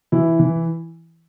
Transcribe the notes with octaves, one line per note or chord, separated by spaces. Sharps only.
E3 E4
E3